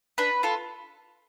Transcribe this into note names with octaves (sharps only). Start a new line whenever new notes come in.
D4 B4
F4 A4